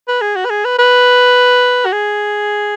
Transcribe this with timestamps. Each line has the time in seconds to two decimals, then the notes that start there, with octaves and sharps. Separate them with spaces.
0.08 B4
0.21 G#4
0.36 F#4
0.45 B4
0.50 G#4
0.65 B4
0.79 B4
1.86 F#4
1.93 G#4